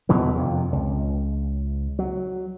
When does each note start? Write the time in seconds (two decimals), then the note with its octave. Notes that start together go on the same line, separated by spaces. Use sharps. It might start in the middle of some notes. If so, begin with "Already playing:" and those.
0.09 E2 B2 D3 E3
0.36 F2 C3
0.72 C#2
1.99 F#3